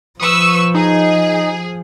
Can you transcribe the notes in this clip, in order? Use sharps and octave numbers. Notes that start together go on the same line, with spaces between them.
F3 B4 C#6 D#6 E6
D#4 G#4